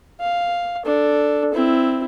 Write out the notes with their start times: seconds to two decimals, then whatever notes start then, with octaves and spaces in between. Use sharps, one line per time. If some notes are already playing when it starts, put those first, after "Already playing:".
0.21 F5
0.85 D4 A4
1.53 C4 E4